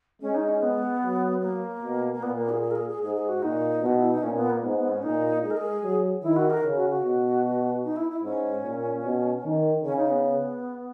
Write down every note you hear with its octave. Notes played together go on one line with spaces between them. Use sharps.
G#3 C#4
D#4
C#4
B3
F#3
A#3
B2
A#3
A#2 B3
A#3
G#4
G#4
A#4
G#4
G#4
G#2 G#4
G#4
F#4
A#2 D#4
B2 F#4
E4
D#4
A#2 C#4
B3
A#3
G#2 B3
B3
C#4
A#2 D#4
G#3 G#4
A#4
G#4
F#3
D#3 E4
F#4
A#4
C#3
F#4
F#4
B2
D#4
E4
E4
G#2 C#4
A#2
B2
D#3
C#3 C#4
D#4
B3